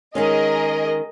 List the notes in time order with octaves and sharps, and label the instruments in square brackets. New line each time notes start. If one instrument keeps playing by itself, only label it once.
[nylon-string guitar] D#3 G#3 C#4 [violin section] G#4 A#4 D#5